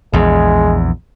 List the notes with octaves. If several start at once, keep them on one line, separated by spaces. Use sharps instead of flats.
A#1 E2 G#3